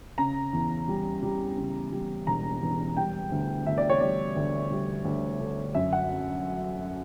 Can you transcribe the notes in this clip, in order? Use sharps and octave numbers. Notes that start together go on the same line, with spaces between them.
C#3 A#5
E2
G3
G3
C#3
G3
E1 A#5
E2
G3 G5
D2
D2 E5
D5
C#5
G3 D5
D2
G3
D2
D3
F#2 E5
F#5